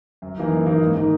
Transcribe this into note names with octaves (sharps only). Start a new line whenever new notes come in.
F#2
E3 A#3 D#4
F#2
E3 A#3 D#4
G#2
D#3 A#3 D#4 A#4